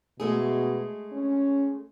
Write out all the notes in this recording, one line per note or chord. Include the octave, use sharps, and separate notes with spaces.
B2 G#3 A3 G#4
C#4